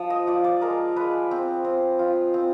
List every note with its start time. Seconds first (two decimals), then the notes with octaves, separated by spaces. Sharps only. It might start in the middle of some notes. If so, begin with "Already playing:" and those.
Already playing: F3
0.10 D#5
0.27 F3 D5
0.44 D5
0.61 G#3 A#4
0.96 G#3 B4
1.31 C4
1.65 C4
1.99 F4
2.34 C4